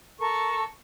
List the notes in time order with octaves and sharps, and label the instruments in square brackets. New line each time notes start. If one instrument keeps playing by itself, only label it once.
[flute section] A4 A#4 C#6